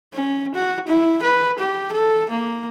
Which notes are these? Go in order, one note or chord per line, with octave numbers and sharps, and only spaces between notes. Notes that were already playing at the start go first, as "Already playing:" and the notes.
C#4
F#4
E4
B4
G4
A4
A#3